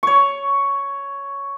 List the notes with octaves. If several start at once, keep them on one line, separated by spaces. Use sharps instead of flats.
C#5 C#6